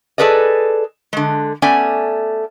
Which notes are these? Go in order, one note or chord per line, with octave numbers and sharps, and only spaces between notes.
G#4 A4 B4 D5 D#5
D3 G#3
A3 B3 C#4 D5 G#5